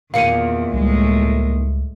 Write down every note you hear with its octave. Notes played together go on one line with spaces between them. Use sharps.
E2 A#2 D#3 A#3 F5 C#7 D#7
C#2 A2 G3 G#3